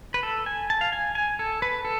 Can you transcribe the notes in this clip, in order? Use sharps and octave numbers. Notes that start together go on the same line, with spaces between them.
B4
A4
G#5
A5
F5
G#5
G#5
A4
B4
A4